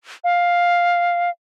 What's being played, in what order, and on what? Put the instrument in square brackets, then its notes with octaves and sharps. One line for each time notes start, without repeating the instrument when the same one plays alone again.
[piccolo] F5